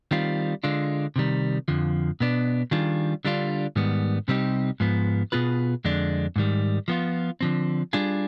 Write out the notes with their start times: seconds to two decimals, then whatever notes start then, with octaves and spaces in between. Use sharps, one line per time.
0.11 D#3 G3 C4 F4
0.63 D3 G#3 D4 F4
1.16 C3 D#3 G3
1.68 F2 D3 F3
2.20 B2 B3 D4
2.71 D#3 G3 D4 F4 G#4
3.25 D3 G3 D4 F4
3.76 G#2 D#3 G3 B3
4.28 C3 G3 C4 D#4 G4
4.80 G#2 F3 B3
5.32 B2 B3 F4 G#4 B4
5.85 F2 D3 G#3 D4
6.36 G#2 D#3 G3
6.88 F3 B3 F4
7.41 D3 F3 C4
7.93 G3 D4 F4 G#4